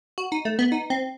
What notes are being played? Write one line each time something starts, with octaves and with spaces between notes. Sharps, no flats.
F#4
D#4
A3
B3
D#4
C4